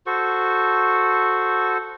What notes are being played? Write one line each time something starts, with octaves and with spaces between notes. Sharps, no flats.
F#4 A4 C5 C#6